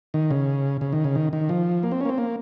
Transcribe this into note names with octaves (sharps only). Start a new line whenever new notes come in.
D#3
C#3
C#3
D#3
C#3
D#3
D#3
F3
A#3
C4
C#4
A#3
C4
A#3